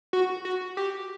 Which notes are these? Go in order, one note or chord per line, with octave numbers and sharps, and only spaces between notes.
F#4
F#4
G4